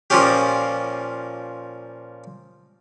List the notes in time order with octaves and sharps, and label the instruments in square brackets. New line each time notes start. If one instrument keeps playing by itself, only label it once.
[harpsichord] A#2 F3 A#3 C#4 G4